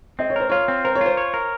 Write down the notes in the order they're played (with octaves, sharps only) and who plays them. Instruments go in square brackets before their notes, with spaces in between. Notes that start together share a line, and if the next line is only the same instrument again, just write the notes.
[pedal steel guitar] C4 [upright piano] D#5
[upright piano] C#5
[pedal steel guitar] A#4 [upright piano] C5
[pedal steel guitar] F4 [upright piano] C#5
[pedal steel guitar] C4
[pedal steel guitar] A#4 [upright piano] C5
[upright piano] C#5
[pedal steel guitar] F4 [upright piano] C5
[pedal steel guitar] C#5
A#4